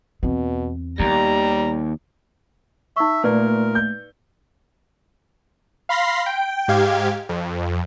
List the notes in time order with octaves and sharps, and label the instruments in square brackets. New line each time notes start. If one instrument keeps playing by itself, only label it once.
[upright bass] E2 C4 [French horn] B2
[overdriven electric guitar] D#2 [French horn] G3 [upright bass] B3 [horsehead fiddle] A#5
[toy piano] D#4 C#6 [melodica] E5
[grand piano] A#2 [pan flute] A3 [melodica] A#4 [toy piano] B4 D5
[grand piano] G6
[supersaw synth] F5 B5 C6 A#6 C7
G5
G#2 G4 F5 G#6
F2